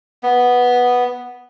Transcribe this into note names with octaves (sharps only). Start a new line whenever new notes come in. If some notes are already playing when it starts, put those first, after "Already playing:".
B3